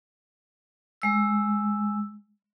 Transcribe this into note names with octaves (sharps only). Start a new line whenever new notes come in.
G#3 E6